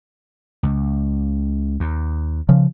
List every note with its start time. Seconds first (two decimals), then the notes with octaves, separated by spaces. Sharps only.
0.63 C#2
1.80 D#2
2.49 C#3 F3